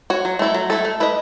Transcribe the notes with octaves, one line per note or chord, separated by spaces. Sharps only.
F#4 C#5
F#3
A3 E4 A4
F#3
A3 E4 A4
A3
E4 B4 D#5